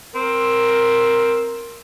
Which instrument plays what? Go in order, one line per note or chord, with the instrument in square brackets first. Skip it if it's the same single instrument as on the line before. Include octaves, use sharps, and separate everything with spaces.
[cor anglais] C4 [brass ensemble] A#4